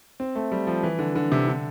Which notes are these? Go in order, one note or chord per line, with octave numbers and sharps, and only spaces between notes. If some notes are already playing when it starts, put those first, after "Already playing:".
C4
A3
G3
F3
E3
D3
D3
C3
D3